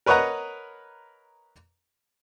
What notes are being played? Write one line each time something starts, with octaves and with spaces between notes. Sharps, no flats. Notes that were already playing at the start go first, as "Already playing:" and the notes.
A#4 B4 C#5 D#5 F#5 A#5